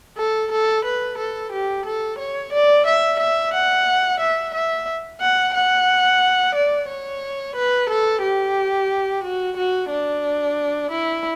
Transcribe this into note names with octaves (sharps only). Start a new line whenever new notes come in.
A4
A4
B4
A4
G4
A4
C#5
D5
E5
E5
F#5
E5
E5
F#5
F#5
D5
C#5
B4
A4
G4
F#4
F#4
D4
E4